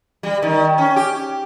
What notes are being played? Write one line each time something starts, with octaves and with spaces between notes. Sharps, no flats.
G3
D#3
C#4
G4